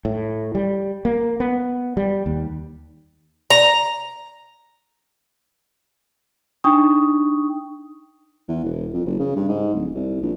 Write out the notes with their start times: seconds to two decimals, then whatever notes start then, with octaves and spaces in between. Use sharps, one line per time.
0.05 A2
0.55 G3
1.05 A#3
1.40 B3
1.97 G3
2.26 D#2
3.50 A#5
6.64 D4 D#4 G5 C#6 D#6
8.48 E2
8.64 E1
8.93 F2
9.06 F#1
9.19 C#3
9.36 G2
9.48 G#2
9.74 D1
9.95 C2
10.22 A#1